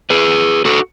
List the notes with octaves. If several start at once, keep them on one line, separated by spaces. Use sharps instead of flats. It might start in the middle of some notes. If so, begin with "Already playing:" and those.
G#4 B4
F#4 A4